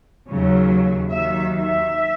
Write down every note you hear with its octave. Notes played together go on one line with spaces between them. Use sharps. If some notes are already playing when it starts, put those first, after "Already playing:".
D#2 C#3 F#3
D#2 D#3 F#3 E5
E5